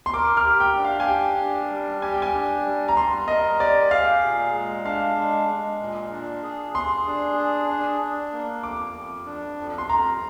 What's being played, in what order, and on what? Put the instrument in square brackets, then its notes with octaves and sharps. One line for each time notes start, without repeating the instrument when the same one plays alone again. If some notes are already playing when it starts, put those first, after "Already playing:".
[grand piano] C6
[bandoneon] A#4 [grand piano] D6
[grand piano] F6
[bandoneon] G4
[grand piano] G5
[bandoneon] D4
[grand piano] F5
G#5
[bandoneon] G4 [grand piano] G5
[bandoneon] D4
G3
[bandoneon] G4 [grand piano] G#5
[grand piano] G5
G#5
[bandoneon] D4
G3
[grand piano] A#5
[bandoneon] G3 [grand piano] C6
[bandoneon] A#4 [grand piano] D#5
[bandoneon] G4 [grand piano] D5
[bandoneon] G#4 [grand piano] F5
[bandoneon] A#2
G#3
[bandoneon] D4 [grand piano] F5
[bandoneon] G#3
G#3
A#2
D4
G#4
[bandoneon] G#4 [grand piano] C6
[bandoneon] D4
G#4
D4
D4
A#3
[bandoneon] F2 [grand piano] D6
[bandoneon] F2
D4
F2
[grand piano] C6
[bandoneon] F2 [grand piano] A#5